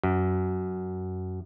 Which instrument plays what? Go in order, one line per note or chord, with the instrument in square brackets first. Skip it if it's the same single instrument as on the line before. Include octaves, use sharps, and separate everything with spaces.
[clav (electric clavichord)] F#2